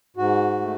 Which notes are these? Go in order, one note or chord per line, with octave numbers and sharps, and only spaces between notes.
G#2 F#4
A3